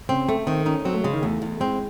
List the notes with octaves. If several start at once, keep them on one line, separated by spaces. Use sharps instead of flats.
C#3 C4
A3
D#3 C4
C#4 D#4
F#3 C4
A3
C#3 G#3
D#3
E2 A3
E2
G#3 C4